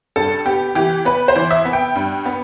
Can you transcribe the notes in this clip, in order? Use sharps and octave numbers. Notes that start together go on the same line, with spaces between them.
G2 A4
B3 G4
E3 G4
B3 B4
C5
E3
E5
B3
G5
G2
B3